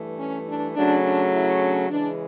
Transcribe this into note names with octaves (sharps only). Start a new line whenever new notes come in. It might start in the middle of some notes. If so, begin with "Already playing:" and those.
Already playing: G2 E3 A3
C#4
D4
C#3 F#3 A3 C#4 D4
D4
E4
D4
C#3 E3 G#3 D4